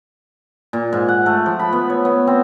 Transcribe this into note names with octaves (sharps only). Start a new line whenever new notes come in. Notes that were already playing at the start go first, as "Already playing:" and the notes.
A#2
G#2
F#5
A3
F3
B5
B3
C#5
B3
C4